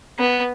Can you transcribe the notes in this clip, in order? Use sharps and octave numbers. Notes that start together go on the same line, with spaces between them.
B3